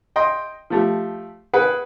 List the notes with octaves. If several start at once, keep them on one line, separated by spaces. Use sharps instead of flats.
D#5 G5 C6
F3 A3 G4
G#4 B4 F#5 G5